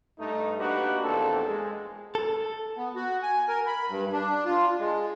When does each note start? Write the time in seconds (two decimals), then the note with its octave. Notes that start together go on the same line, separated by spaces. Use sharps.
0.18 G2 A3 D#4
0.59 A#3 D4 D#4 F#4 G4 B4
1.03 A#1 E2 A#3 C4 A4
1.46 G#3
2.15 A4
2.77 B3
2.95 F#4
3.23 G#5
3.48 A#4
3.67 B5
3.88 G2
4.13 D4
4.45 F4
4.79 G#3